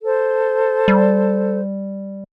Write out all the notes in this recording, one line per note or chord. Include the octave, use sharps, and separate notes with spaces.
A4 C5
G3